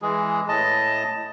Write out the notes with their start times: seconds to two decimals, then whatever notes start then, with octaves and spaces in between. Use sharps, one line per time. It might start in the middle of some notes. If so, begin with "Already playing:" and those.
0.02 E3 G#3 G#4
0.48 A2 D#5 A5